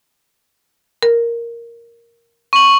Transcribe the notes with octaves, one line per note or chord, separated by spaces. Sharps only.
A#4
C#6 F#7